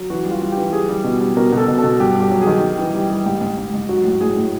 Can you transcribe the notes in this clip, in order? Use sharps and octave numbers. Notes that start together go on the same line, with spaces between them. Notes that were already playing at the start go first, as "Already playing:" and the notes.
Already playing: F#3
E3 F#4
G3
F4
G3
G4
E3
G3 G#4
G3
B2
G3
B2 A#4
B2
A4
B2
A4
B2
G2 G4
G2
G4
F#3
G#4
D#3
G3
E3
G3
G3
G#2 G4
G#2
G#2
G#2
F#3 F#4
A2
A2 G#4
A2